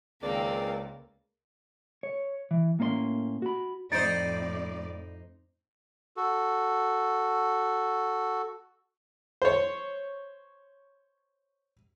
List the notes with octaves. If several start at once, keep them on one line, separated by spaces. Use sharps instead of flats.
C#2 D#3 A#3 C4 D5
C#5
E3
A2 A#3 C#4 C5 C6
F#4 B5
F2 A2 D#4 C5 D5 A6 C#7 D7
F#4 A4
C5 C#5